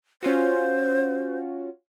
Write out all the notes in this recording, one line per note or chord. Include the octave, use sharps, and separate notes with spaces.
C#4 F4 F#4 C5